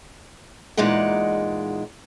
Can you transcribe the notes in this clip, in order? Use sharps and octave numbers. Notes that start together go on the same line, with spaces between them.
E2 A#2 G#3 D#4 D5 F#5